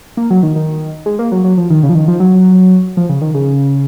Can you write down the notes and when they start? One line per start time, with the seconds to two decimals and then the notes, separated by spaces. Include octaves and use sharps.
0.17 A#3
0.30 F#3
0.43 D#3
0.56 D#3
1.06 G#3
1.19 A#3
1.32 F#3
1.44 F#3
1.57 F3
1.70 D#3
1.83 C#3
1.89 F3
1.95 D#3
2.08 F3
2.20 F#3
2.97 F3
3.09 C#3
3.21 D#3
3.34 C#3